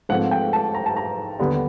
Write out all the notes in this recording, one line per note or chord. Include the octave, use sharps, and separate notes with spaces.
G#2 F3 A3 C4 F#5
G5
A5
A#5
A5
A#5
D#2 D3 G3 B3